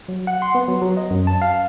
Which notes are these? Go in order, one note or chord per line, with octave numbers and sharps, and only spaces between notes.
F#3
F#5
C6
B3
F#3
F#3
D#5
F#2
A5
F5